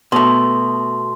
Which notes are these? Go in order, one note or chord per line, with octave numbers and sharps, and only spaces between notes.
B2 A3 C6